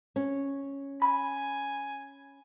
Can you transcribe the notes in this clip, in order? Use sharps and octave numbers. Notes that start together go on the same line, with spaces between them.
C#4
G#5 B5